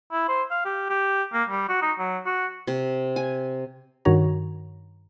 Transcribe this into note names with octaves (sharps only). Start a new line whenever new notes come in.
E4
C5
F5
G4
G4
A#3
G3
F#4
D#4
F#3
F#4
C3
G#5
G2 D#3 F#4 C#5 A#5